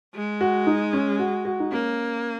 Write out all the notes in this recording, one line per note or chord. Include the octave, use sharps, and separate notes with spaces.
G#3
F#4
D#4
C#4
F#4
F#4
D#4
A#3 C#4